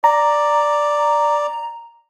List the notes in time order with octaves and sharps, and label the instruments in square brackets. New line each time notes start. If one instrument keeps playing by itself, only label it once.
[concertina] D5 [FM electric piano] A#5